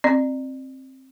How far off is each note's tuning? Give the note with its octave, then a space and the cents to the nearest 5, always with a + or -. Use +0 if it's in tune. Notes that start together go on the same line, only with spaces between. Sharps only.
C4 +15 D5 +35